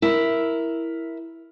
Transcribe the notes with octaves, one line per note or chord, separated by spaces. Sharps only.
E4 A#4 E5